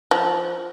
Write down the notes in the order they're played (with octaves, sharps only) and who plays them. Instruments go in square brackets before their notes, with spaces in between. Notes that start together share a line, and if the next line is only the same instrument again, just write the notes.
[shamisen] F3